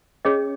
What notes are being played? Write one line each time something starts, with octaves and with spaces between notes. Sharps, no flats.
C#4 G#4 C#5 D#5